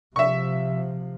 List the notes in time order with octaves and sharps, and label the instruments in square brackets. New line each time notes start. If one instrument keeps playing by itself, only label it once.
[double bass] C3 F3 [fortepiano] E5 C#6